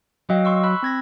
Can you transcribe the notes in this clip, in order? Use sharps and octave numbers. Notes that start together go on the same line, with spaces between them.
F#3 D#5 F5 G5
C6 C#6 E6
B5 E6 F#6
C4 G#6 A#6